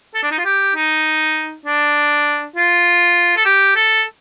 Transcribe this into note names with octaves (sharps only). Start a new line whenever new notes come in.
A4
D4
D#4
F4
G4
D#4
D4
F4
A4
G4
A4